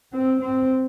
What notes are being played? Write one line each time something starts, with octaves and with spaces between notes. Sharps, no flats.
C4
C4